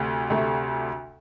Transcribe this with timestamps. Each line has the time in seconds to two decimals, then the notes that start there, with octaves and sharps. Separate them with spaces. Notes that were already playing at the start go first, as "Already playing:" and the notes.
Already playing: D2 C3 A3
0.30 D2 C3 A3